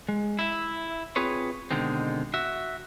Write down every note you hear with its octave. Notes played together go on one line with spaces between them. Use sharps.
G#3
E4 E5
C4 F4 G#4 B4 C#5
B2 D3 D#3 G#3 C4
F#4 E5